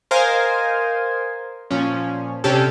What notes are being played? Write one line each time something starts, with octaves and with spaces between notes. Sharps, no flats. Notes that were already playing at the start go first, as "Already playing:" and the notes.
A#4 C5 D#5 F5 G#5
A#2 F3 C#4
C3 C#4 D4 G4 A4